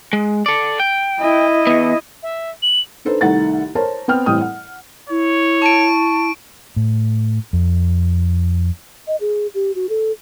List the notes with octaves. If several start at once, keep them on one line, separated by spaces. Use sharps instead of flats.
G#3
A4 D5
G5
E4 D#5
E2 B3
E5
F#7
D4 D#4 A4 B4 C5
C2 D#3 A3 D#4 F#5 A6
A#4 C5 C#5 A5
B3 C4 G5 F6
A1 E3 G3 C4 G5 D#6
F#5
E4 C#5
A5 C#6 D7
A2
F2
D#5
G#4
G4
F#4
A4